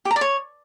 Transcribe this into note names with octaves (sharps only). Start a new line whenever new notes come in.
G4
A#5
D5
C#5